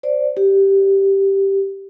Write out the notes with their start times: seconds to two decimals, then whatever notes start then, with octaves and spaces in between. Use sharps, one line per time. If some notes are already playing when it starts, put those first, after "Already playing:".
0.03 C5 D5
0.37 G4